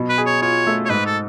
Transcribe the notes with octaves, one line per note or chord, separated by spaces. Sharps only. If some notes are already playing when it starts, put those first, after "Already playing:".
Already playing: B2 F#3
B4
G#4
C#5
F4 C#5
A3
C#5
G#2 B4
A4